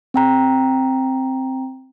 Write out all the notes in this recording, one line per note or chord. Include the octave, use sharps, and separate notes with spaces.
C4 G5 A#5